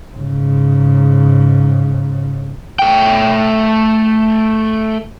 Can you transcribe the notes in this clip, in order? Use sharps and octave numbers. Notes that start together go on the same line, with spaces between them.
G#2 C#3
A3 G5